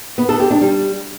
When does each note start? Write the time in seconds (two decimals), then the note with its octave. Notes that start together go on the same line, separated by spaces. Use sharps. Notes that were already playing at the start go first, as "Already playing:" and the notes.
0.18 B3
0.29 A4
0.40 G4
0.50 D4
0.61 G3